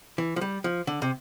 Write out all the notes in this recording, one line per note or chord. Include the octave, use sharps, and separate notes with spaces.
E3
F3
G3
F3
D3
C3